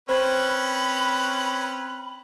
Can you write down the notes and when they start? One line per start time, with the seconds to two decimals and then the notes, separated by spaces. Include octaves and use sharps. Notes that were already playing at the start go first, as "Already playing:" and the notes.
0.09 C4 C#4 B4 C5 B5 G#6